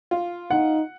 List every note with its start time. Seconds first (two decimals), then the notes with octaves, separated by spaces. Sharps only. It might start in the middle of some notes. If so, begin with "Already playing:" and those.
0.11 F4
0.51 D#4 F#5